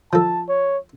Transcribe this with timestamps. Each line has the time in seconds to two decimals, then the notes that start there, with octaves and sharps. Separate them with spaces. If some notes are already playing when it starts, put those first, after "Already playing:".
0.13 F3 A4 A5
0.49 C#5